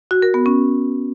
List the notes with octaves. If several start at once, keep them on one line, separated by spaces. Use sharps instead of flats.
F#4
A#4
B3
C#4